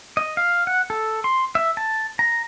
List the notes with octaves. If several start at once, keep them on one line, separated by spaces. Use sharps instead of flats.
D#5
F5
F#5
A4
C6
E5
A5
A#5